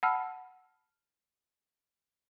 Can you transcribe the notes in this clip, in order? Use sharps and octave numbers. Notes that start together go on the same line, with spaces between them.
F#5 A5 B5 E6 F6